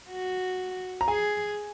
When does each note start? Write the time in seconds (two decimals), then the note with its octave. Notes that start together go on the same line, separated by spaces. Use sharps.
0.10 F#4
1.01 A#5
1.08 G#4 G#5